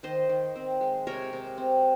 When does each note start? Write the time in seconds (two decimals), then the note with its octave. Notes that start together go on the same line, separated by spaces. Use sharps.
0.03 D#3 C5 D#5
0.29 D#3
0.56 C4
0.81 G#3
1.07 C3 A#4 C#5
1.33 C3
1.58 C4